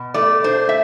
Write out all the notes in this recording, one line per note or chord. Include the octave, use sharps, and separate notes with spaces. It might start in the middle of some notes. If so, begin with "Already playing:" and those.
Already playing: B2
A3 D5
D4 C5
E5